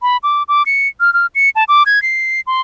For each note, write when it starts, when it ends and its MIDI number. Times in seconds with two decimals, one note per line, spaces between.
0.02 0.17 83
0.23 0.43 86
0.48 0.63 86
0.66 0.88 97
1.00 1.13 89
1.13 1.26 89
1.35 1.50 97
1.56 1.64 81
1.68 1.83 86
1.86 2.02 92
2.02 2.41 96
2.47 2.61 84